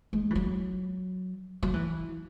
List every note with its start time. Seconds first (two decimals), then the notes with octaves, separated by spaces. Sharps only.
0.13 G#3
0.30 E3
0.35 F#3
1.63 F#3
1.74 E3